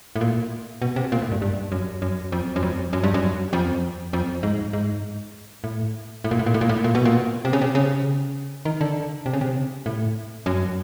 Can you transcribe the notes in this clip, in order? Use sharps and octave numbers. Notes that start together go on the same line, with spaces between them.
A2
A#2
B2
C3
A#2
A2
G2
G2
F#2
F#2
F2
F#2
F2
F#2
G2
F#2
F2
F2
G#2
G#2
A2
A2
A#2
A2
A#2
A2
A#2
A2
A#2
B2
A#2
C3
C#3
C3
C#3
D#3
D3
C3
C#3
C3
A2
F#2